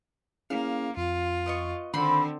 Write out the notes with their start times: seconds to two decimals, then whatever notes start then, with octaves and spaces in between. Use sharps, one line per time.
0.50 A#3 C#4 E4 G#4 F5
0.97 F2 F4
1.46 B3 D#5 C#6
1.94 D3 D#3 C4 D4 C5 B5 C6